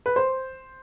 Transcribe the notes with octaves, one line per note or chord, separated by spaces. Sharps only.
B4
C5